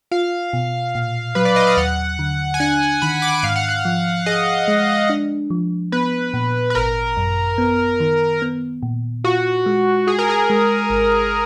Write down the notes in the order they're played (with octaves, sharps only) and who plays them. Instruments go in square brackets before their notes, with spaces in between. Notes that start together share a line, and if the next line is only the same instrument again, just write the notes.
[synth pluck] F4 [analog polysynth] F5
[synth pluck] B2
A#2
[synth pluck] F#3 [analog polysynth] B4
[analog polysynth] D5
D#5
F5
[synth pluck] D#2 [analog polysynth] F#5
[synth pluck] D3
[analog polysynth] G#5
[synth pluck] D4 [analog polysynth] F#5
[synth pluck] D#3 [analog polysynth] B5
[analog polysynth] D6
[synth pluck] G#2 [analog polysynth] F5
[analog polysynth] F#5
F5
[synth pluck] F3
[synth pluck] G#4 [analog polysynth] D#5
[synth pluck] G#3
D4
F3
[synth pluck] B3 [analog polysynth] B4
[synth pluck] A#2
[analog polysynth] B4
[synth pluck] G#1 [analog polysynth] A#4
[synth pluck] F#2
B3
D#3
B3
A#2
[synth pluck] F4 [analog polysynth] F#4
[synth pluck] G#3
[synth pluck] F#4 [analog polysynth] G#4
[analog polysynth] A#4
G#4
[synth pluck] G#3
G#1